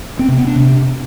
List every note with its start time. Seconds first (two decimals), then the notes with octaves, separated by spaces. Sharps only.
0.19 C4
0.28 C3
0.38 B3
0.47 D4
0.56 C3